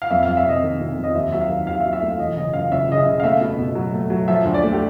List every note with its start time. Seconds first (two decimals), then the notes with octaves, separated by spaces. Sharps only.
0.02 F5
0.11 F2 E5
0.23 F5
0.27 F2
0.37 E5
0.46 C3 D#5
0.63 D#3
0.80 C3
0.97 F2
1.04 D#5
1.15 D#2 E5
1.33 F#3 E5
1.41 F5
1.49 D#3
1.67 D#2 F5
1.80 E5
1.84 F#3
1.93 E5
2.02 A3 F5
2.19 E3 D#5
2.36 F#1 D#5
2.53 F#2 F5
2.71 F#1 E5
2.89 C#3 D#5
2.97 E5
3.06 C#3
3.20 F5
3.24 A3 E5
3.41 B2
3.59 B2
3.75 F#3
3.94 A3
4.10 F#3
4.28 F3 E5
4.45 D2
4.54 D5
4.63 A3
4.73 G4